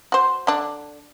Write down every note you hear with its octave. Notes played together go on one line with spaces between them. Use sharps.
F#4 C5
D3 D4